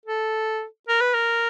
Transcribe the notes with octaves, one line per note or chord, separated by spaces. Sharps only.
A4
A#4
B4
A#4